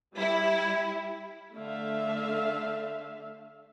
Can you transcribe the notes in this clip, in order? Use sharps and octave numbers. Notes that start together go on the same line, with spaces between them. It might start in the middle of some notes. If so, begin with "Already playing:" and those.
G3 E4
D3 A3 E5 F5